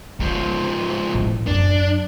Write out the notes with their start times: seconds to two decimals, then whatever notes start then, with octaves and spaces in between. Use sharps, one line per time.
0.20 G#2 D3 F3
1.15 A2
1.47 F#2 D4